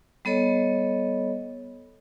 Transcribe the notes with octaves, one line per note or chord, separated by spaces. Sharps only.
G3 B3 A4 C#5 D#5